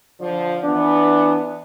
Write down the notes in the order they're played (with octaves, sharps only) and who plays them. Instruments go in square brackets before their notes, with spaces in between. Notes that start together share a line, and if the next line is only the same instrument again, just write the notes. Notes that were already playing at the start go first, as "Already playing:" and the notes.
[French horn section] D3 F3 D5
[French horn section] E3 B3 [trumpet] D4